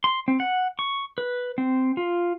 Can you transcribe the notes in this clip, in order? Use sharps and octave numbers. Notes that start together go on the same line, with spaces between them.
C6
C4
F#5
C#6
B4
C4
F4